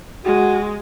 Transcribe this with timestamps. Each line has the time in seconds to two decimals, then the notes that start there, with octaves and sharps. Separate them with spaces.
0.25 G#3 F#4